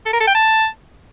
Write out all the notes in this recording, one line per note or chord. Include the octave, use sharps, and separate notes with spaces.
A4
A#4
A4
G5
A5